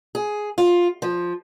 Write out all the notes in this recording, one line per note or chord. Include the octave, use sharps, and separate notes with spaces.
G#4
F4
F3